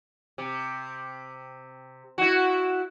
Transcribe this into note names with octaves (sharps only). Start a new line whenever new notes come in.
C3
E4 F#4